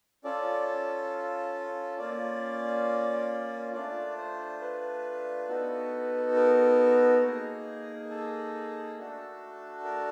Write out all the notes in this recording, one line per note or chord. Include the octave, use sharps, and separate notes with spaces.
C#4 F4 A4 D5
A#3 C#4 F4 D5
A3 D4 F4 D5
C5
B4
B3 D#4 F#4 A4
A#4
A#3 D#4 G#4
A4
A3 D4 F#4 A4
A#4